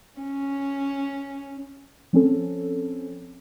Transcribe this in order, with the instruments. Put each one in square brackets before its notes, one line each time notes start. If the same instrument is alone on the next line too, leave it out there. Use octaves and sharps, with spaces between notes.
[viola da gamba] C#4
[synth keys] F3 C4 C#4 A4